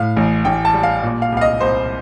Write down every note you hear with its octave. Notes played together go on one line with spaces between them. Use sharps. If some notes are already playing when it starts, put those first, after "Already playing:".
Already playing: A2 F5
A1
A1 G5
A5
G3
F5
A#2
F5
C2
F5
D#5
C2 C5